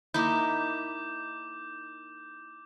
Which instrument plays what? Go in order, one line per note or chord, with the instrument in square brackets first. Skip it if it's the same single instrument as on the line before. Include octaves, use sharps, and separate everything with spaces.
[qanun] A#3 D#4 E4 [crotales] D6 G6